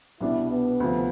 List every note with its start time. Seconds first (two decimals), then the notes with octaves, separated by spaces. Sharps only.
0.20 C2 B2 G3 B3 D4 E4
0.51 B3
0.80 D2 C3 F3